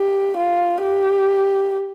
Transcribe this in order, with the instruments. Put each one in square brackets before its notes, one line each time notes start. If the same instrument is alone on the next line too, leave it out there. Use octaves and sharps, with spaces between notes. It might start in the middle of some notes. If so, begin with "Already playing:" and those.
Already playing: [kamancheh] G4
F4
G4